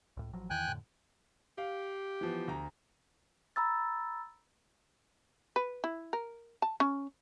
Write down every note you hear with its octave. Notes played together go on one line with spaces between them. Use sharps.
C#2 A2
A1 F3 F#3
E2 D#3 E3 G5 G#5 F#6
F2 A2 D3
G4 F5
E3 F3 B3
D2 A#5
A#5 B5 E6 A6
B4
E4
A#4
A5
C#4